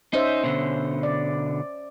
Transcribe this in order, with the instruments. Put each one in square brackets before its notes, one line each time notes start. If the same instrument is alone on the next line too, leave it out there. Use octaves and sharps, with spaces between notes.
[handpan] C#4 C5 E5 [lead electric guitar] D#4
[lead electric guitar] B2 D3
[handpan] D5